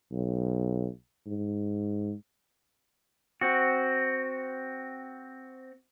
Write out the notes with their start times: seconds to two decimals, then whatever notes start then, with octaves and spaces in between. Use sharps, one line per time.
0.12 B1
1.26 G#2
3.41 C4 F#4